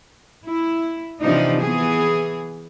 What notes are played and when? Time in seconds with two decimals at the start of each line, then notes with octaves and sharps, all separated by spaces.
0.46 E4
1.22 C3 E3 F3 D4 D#4
1.61 E3 B3 G#4